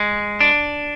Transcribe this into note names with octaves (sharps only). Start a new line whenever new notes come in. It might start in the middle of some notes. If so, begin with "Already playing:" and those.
Already playing: G#3
D4